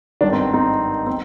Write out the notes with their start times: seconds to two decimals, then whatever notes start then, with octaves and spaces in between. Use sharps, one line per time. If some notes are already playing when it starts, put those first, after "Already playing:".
0.21 G#1 G2 D#3 D4
0.32 C4
0.53 C4 D#4
1.07 C4